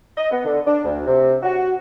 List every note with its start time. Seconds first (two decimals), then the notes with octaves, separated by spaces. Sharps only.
0.17 D#5
0.31 B3
0.45 D3
0.66 D4
0.85 D2
1.07 C3
1.43 F#4